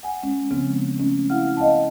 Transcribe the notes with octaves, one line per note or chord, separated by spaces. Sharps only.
F#5 G#5
G#3 C#4
C#3 F3 G#3 B3 C4
A3 C#4
E4 F5 F#5 F6
D#5 F5 F#5 A5